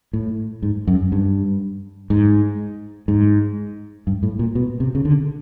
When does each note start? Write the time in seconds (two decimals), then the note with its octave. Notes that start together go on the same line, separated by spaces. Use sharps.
0.13 A2
0.63 G#2
0.87 F#2
1.12 G2
2.10 G#2
3.08 G#2
4.07 G2
4.23 A2
4.39 A#2
4.55 B2
4.80 C3
4.95 C#3
5.05 D3